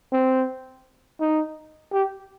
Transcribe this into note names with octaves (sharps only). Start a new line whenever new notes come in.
C4
D#4
G4